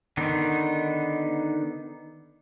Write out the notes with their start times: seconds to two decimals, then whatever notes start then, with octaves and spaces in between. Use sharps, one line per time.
0.17 D3 D#3 B3 D#4